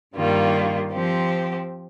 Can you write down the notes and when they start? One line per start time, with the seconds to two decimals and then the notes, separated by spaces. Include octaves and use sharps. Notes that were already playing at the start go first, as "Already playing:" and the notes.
0.16 G2 D#3 G3 A#3 F4
0.93 F3 C4 G4